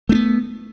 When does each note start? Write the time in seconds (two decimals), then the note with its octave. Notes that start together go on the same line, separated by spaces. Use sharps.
0.09 A3
0.12 D4
0.15 B3